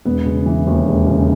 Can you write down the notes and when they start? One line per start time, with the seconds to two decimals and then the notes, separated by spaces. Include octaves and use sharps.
0.05 E1 B3
0.26 C#3
0.46 E3
0.67 D#2
0.86 E1
1.07 C#3